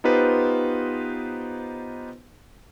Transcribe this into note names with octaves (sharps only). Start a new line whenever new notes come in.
B3 D#4 F4 G4 B4 C5